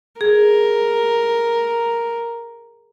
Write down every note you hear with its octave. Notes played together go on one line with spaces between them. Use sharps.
G#4 A#4